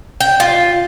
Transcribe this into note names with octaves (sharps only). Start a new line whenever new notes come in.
G5
F4